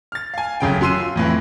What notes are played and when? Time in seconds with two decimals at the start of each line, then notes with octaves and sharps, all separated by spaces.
0.12 F6 A6
0.34 F5 G#5
0.60 F1 F#2 C#3 G5
0.81 F#2 F#4 C6 E6 D#7
1.00 F4
1.15 F2 A2 E3